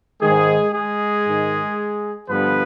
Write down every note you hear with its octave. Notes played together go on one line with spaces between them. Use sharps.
G#2 D#3 G#3 G#4
G#3 G#4
G#2 D#3
G2 D3 F3 B3 B4